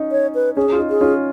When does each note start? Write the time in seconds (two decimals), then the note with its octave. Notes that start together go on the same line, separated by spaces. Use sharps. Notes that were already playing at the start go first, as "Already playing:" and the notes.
Already playing: C#4 D#4
0.12 C#5
0.35 B4
0.56 C#4 G#4
0.72 F4
0.79 D#4
0.90 G#4
1.01 C#4 F4